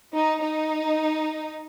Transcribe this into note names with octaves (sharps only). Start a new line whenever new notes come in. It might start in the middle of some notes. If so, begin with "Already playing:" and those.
D#4
D#4